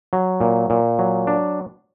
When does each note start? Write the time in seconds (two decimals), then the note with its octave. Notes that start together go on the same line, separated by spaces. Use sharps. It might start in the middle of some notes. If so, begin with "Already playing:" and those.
0.13 F#3
0.41 A#2
0.70 A#2
0.99 F#3
1.27 D4